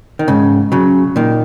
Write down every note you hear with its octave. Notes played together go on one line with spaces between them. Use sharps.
D#3
G#2 C#3
C#3 F#3
A#2 D#3